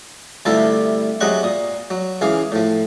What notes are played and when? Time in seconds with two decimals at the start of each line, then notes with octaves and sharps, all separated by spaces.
0.45 D2 C3 G3 E4 F4 A4
1.20 C3 F#3 G#3 D#5 F#5 C#6
1.43 A#2 D#6
1.90 F#3
2.21 C#2 E3 G#4 F5
2.52 A2 F3